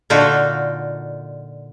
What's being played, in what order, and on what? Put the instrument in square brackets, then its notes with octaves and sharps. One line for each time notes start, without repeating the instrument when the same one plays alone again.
[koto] A#2 D3 D#4 F4 F#4